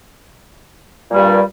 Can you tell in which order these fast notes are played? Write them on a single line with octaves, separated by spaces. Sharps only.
A#2 G3 G2